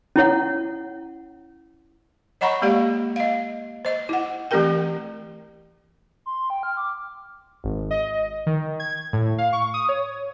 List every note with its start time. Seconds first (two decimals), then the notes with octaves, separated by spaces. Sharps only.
0.16 C#4 E4 C#5 F#5
2.41 C#5 D#5 F#5 A#5 B5 C#6
2.62 G#3 A#3 G4 D5 F5
3.16 D#5 F5
3.85 C5 D#5
4.09 E4 F#5
4.51 E3 A3 C4 G4 A#4 G5
6.26 C6
6.50 G5
6.63 F6
6.77 D6
7.64 G#1
7.91 D#5
8.46 D#3
8.80 G#6
9.13 A2
9.38 F5
9.53 C#6
9.74 D#6
9.89 C#5